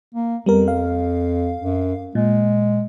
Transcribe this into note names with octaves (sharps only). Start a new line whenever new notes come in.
A#3
F2 G3 B3 A#4
F5
F#2
A#2 G#3